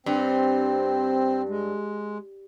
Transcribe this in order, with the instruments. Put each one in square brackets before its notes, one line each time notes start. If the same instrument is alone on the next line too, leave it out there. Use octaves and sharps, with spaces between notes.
[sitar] G2 [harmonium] C4
[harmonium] G#3